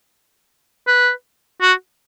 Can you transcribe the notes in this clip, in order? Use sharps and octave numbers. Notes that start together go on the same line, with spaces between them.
B4
F#4